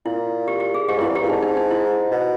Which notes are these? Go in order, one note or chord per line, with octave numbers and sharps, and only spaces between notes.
A#2 E4
G4
G4
G#4
G#2 G4
G2 E4
E2
G4
A#2
G#2 D#4
D#4
D#4
E4
B2